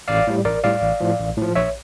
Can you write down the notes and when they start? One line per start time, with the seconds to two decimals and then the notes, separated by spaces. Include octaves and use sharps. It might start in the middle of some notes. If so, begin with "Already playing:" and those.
0.08 A1 D5 F5
0.27 A2 G3
0.45 A1 A#4 D5
0.64 A2 G3 D5 F5
0.82 A1
1.00 A2 F3
1.20 A1
1.37 A2 F3
1.55 A#1 C#5 E5